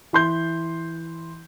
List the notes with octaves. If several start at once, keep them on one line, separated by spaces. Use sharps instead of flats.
E3 C6 G6